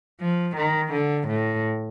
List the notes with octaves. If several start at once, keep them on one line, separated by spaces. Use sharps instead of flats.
F3
D#3
D3
A2